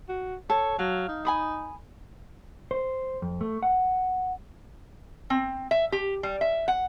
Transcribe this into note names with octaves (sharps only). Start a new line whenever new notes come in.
F#4
A4 C#5
F#3 F5
D#4
G#5 B5 D#6
C5
F2
A3
F#5
C4
E5
G4
G3
E5
F#5